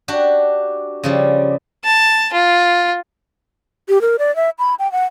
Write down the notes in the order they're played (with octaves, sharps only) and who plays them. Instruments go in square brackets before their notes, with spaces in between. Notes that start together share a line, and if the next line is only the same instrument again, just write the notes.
[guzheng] D4 F#4 G4
C#3 F3 G3
[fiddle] A5
F4
[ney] G4
A#4
D5
E5
B5
G5
F#5